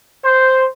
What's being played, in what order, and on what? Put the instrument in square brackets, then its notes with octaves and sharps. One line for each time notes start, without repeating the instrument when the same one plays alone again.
[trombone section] C5